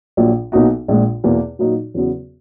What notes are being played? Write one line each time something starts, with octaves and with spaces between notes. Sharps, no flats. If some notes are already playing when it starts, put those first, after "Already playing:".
A#1 A#2 F#3 A#3
B1 B2 A#3 D#4 F#4
A#1 A#2 G#3
E2 B2 A#3
A#2 F#3 A#3 D#4 F#4
E2 C#3 F#3 B3 F#4